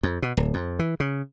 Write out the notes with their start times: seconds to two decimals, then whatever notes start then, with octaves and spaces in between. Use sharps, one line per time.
0.03 F2
0.22 B2
0.37 D1
0.54 F2
0.79 E3
1.00 C#3